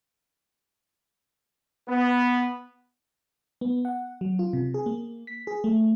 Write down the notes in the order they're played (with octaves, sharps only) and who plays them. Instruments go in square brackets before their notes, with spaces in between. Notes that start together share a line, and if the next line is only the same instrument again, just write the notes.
[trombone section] B3
[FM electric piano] B3
F#5
F#3
F4
C3
G#4
A#3
B6
G#4
A3